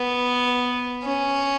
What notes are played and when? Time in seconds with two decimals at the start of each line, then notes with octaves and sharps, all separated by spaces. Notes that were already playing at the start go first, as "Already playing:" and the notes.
Already playing: B3
1.04 C#4